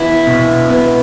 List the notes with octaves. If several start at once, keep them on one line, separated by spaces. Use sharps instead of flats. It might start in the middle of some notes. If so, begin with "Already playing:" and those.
Already playing: B3 E4
B2
B3